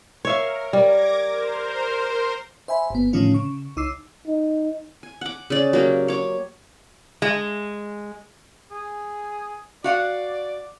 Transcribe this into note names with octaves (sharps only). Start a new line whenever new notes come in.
A#4 C#5 E5 F5
G3 D6 G#6 A#6
A#4 C5
C5 E5 G#5 B5
G1 B3
A2 D3 D#3 F3 C#4 F4
C#3 C#6
C#2 D#4 D6 E6 C7
D#4
G#5
F#5 D6
C#3 D5
F#3 A#3 G4
C#5 D6
G#3
G#4
F#4 D5 F5 F#5